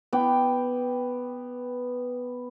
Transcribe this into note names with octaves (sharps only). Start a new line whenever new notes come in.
B3 G5 D6